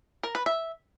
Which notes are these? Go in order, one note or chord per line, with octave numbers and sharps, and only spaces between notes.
A#4
B4
E5